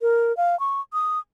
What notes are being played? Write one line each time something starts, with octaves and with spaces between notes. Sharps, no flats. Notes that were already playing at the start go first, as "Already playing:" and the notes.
A#4
F5
C#6
D#6